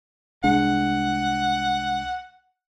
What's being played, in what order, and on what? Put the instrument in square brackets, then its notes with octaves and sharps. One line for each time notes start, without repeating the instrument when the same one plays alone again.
[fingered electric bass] C2 G#3 D4 [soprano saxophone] F#5